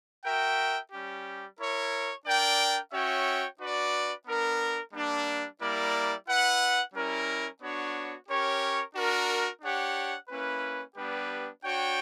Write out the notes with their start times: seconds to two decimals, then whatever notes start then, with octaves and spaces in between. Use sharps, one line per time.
0.24 F#4 A#4 E5 G5
0.91 G3 C#4 G4
1.58 E4 A#4 C#5
2.25 D4 A#4 D5 G5
2.92 C#4 F#4 C#5 E5 G5
3.59 D4 F#4 B4 D5
4.26 B3 D4 A#4
4.93 G3 A#3 D4
5.60 G3 A#3 E4 A#4 D5
6.27 E4 B4 F#5
6.94 G3 C#4 E4 A#4
7.61 B3 D4 F#4 C#5
8.28 C#4 G4 A#4 C#5
8.95 D4 F#4 A#4
9.62 D4 G4 C#5 F#5
10.29 A#3 C#4 E4 B4
10.95 G3 B3 D4 G4 B4
11.63 D4 F#4 C#5 G5